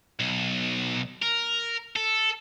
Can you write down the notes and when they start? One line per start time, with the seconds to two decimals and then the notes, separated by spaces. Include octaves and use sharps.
0.20 B1
1.22 A#4
1.96 A4